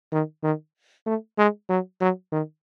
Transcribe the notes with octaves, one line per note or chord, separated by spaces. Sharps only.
D#3
D#3
A3
G#3
F#3
F#3
D#3